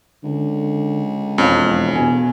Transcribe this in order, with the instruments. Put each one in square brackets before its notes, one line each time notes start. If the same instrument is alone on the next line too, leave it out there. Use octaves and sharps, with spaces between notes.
[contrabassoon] C#2 [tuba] D3
[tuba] E1 [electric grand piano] F2 [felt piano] C#4 F5
[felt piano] B2 G#5